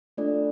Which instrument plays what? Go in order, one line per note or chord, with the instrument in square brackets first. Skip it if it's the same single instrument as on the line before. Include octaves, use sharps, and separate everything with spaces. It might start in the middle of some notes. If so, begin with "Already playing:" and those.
[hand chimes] A3 D4 F4 A4 D5